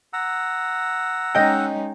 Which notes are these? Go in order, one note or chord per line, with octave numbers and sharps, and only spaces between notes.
F#5 A#5 E6
G#3 C#4 D#4 D#5 G5